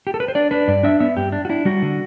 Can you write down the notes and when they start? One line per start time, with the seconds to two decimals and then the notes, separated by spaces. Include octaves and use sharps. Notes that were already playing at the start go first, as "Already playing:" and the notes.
0.07 G4
0.14 A4
0.20 B4
0.28 C5
0.35 D4 D5
0.51 D4 B4
0.68 G2 D5
0.83 D4 E5
1.00 B3 E5
1.17 G2 G4
1.32 D4
1.45 F#4
1.49 D4 E4
1.65 G3 F#4
1.82 D3